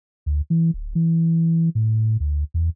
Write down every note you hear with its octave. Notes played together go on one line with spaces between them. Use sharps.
D2
E3
D1
E3
A2
D2
E2